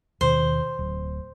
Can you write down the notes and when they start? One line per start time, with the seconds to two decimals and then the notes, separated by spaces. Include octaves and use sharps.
0.21 D#2 B2 D#3 C5
0.79 D1